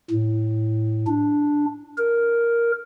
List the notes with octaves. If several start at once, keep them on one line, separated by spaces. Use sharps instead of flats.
A2
D4
A#4